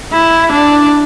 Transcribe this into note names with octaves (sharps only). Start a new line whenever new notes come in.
E4
D4